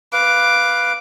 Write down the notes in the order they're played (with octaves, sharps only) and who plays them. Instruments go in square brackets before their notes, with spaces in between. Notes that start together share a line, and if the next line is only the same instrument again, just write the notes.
[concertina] B4 F5 [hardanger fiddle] D6